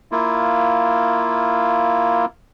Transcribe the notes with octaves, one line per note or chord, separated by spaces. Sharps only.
A#3 E4 F4